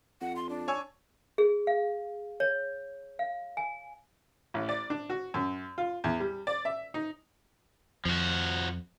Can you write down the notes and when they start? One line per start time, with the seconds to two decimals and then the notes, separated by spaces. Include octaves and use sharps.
0.21 F2 F#5
0.36 C6
0.49 D4
0.68 C#5 G#5 E6
1.38 G#4
1.67 F5
2.40 C#5
3.19 F5
3.57 G#5
4.54 A1
4.69 D5
4.90 D4
5.10 F#4
5.34 F#2
5.78 F4
6.04 E2
6.20 G3
6.47 D5
6.65 E5
6.94 D#4
8.05 F2 F3 F#4